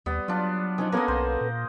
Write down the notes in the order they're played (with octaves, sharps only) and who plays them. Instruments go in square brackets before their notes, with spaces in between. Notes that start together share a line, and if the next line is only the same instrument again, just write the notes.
[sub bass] D#2 [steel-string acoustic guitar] G3 [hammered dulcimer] B3
[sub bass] F#3 [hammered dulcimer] D4 F4
[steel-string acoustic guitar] F3 C#4 D#4 [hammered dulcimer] G#4
[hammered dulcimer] A#3 D#5 [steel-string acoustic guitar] B3 C#4 A4
[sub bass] B1 [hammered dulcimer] C5
[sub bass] A#2